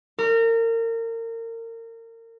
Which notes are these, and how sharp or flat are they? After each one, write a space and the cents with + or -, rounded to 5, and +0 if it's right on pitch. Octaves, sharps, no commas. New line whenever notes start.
A#4 -30